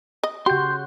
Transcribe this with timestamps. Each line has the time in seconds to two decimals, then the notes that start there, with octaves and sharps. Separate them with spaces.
0.23 D#5
0.46 C#3 F#4 G4 C6 G6